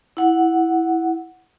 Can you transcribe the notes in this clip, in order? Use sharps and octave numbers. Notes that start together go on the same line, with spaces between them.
E4 F#5